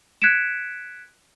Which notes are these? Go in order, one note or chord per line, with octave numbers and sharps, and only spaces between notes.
F#6 G#6 B6 C#7 D7 E7